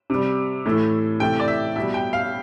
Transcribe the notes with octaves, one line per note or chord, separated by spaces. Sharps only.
C3 G3
A2 E3 A3
C3 E3 A3 G5
D5
E5
B2 G3 E5
G5
F5